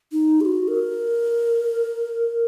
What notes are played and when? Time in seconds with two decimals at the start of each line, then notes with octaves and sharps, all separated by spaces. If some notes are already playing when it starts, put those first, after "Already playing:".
0.12 D#4
0.41 G#4
0.45 F#4
0.68 A#4